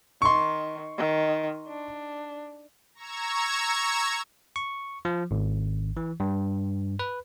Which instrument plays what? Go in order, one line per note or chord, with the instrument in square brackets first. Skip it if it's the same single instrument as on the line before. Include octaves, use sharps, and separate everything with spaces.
[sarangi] D#3 [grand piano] C6 C#6
[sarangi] D#3
D4
[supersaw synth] A#5 C#6 E6 G#6
[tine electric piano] C#6
F3
G#1
E3
G2
B4